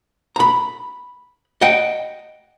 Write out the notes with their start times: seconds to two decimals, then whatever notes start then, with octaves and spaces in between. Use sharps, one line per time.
0.36 A#5 B5
1.61 D#5 F#5 G5